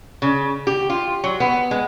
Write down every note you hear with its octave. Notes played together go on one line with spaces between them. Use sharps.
C#3
G4
F4
F#3
B3
G#3